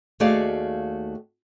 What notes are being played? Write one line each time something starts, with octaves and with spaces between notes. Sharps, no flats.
D#2 A3 F#4 G#4 D5 F5